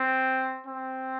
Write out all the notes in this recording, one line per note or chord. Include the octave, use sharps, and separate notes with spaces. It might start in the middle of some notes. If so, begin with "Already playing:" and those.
Already playing: C4
C4